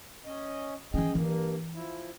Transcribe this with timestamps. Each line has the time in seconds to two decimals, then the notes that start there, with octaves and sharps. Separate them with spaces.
0.26 C#4 D#5
0.94 E3 C#4 G#4 D#5 G5
1.15 G2 E3 A#3
1.74 F3 E4